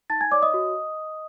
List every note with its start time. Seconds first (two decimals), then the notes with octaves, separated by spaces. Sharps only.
0.10 D#4 A5 A6
0.21 G#5 G#6
0.31 C#5 D5 D6
0.42 D#5 D#6
0.54 F#4